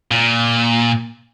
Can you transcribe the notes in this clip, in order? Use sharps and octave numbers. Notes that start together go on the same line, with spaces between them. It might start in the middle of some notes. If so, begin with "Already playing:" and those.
A#2